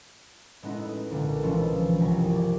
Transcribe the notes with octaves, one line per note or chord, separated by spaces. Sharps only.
A2 G#3 B3 C#4 D#4 E4
B1 A#2 D3
E3 F3 G#3 C#4 E4 F4
G1 C2 C3 A#4 G#5 B6
D5 D6 G#6